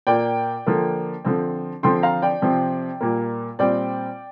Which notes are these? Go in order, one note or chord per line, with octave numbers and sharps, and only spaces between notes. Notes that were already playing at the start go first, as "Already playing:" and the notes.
A#2 A#3 D5 G5
D3 F3 A#3
D3 F3 C4
D3 F3 C4 G5 C6
F5 A#5
D5 G5
C3 F3 C4
A#2 G3 A#3
A#2 G3 C4 D5 G5